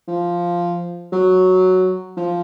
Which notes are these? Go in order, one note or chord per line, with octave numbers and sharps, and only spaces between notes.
F3
F#3
F3